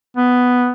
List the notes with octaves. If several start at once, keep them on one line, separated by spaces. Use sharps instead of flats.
B3